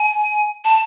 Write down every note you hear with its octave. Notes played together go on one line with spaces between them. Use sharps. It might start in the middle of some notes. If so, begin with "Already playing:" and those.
Already playing: G#5
A5